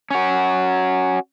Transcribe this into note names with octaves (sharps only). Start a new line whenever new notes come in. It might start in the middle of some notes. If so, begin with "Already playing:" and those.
C#4 F#4